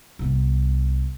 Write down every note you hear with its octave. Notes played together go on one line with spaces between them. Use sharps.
C2 B3